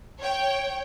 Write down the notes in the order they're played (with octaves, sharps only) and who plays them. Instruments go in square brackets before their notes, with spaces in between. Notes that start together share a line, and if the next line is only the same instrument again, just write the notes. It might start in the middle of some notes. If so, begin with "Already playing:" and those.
[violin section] C#5 G5